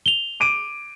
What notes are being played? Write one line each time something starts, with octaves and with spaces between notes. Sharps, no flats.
F7 G7
D6 D7 D#7